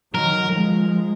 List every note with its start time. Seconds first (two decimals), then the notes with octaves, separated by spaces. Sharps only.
0.13 D#3 F#3 A#4
0.50 F3 G#3